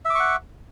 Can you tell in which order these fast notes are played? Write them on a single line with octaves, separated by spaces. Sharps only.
E5 D6 C#6 F#5